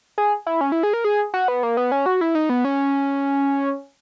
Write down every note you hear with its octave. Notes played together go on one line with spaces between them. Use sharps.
G#4
E4
C#4
E4
G#4
A#4
G#4
F#4
B3
A#3
B3
C#4
F#4
E4
D#4
B3
C#4